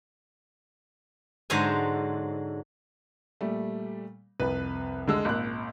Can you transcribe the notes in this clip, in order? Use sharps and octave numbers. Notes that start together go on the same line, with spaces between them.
G#2 D3 F#3 C5 G#5
A#2 G3 A3
C2 F2 B4
D3 G#3 E6
G#1 C#2 A#2 F#6